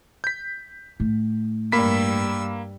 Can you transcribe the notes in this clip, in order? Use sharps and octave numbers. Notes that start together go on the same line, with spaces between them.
G6 B6
A2
G2 G3 A#3 B5 E6 B6